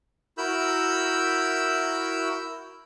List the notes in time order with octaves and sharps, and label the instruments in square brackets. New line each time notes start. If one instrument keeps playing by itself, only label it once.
[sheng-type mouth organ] E4 F#4 A#4 B5 E6 G6